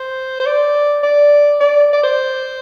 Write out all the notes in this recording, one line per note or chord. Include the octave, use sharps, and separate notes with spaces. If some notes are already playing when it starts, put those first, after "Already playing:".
Already playing: C5
C5
D5
D5
D5
D5
C5